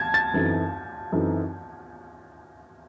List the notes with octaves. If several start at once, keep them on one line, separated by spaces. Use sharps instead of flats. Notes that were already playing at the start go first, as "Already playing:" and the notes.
Already playing: A5 G#6
A6
F#2 E3 C4 D#4 A4
F#2 E3 C4 D#4 A4